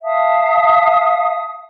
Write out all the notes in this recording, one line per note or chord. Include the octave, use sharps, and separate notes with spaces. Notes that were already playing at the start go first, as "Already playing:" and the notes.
E5 F5 A5 D#6